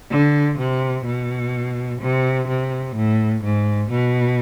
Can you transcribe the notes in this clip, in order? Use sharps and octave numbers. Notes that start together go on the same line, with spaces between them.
D3
C3
B2
C3
C3
A2
G#2
B2